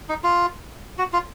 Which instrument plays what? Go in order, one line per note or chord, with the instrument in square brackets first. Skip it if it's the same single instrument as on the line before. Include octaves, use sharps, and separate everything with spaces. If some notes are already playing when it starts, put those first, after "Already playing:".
[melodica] D#4
F4
F#4
F4